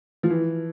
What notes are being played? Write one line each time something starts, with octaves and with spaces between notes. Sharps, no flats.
F3
E3